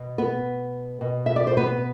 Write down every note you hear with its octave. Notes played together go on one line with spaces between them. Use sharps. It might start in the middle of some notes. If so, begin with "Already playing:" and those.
Already playing: B2
B3 B4
B2
E5
D5
C5
B3 B4